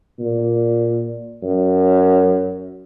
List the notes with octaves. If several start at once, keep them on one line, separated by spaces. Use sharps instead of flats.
A#2
F#2